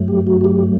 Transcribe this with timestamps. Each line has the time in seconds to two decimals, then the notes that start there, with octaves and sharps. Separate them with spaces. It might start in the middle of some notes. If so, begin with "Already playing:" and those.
Already playing: G2 F#3 A3
0.08 G4
0.27 F#4
0.41 F#4
0.44 G4